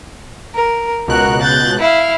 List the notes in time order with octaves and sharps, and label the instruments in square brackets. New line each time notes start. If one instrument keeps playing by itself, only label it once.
[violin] A#4
[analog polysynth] C#2 B2 F#6 [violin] F#4 A#4
[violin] G6 A6
E4 F5